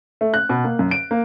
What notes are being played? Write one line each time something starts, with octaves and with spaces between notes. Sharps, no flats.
A3
F#6
B2
A#3
F#2
D7
A#3